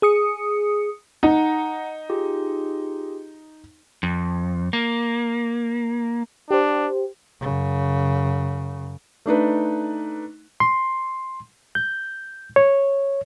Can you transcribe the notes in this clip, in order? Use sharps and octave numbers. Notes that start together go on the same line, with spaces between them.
G#4 D#6 C#7
D#4 F#5 A#5
F4 G4 G#4
F2
A#3
D4 G4 C5
F#2 C#3
A3 D4 D#4 B4
C6
G6
C#5